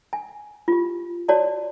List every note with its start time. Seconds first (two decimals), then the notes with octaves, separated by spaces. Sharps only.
0.13 G#5
0.68 F4 G4
1.28 F#4 C#5 D5 A5